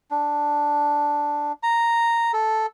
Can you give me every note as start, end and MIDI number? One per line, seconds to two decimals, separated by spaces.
0.11 1.52 62
1.63 2.32 82
2.33 2.66 69